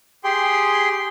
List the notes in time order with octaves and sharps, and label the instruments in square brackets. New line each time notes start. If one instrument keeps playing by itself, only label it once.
[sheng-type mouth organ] G4 G#4 G5 C6